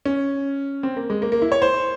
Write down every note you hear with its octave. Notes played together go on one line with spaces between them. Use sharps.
C#4
C4
A#3
G#3
A#3
A#3
E4
C#5
C5